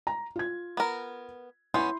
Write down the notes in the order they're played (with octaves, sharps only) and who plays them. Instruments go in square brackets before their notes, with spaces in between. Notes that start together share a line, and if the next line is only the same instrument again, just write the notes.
[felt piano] A#5
F4 G#6
[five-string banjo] B3 A#4
[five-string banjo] B3 C#4 [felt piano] E4 C6 G6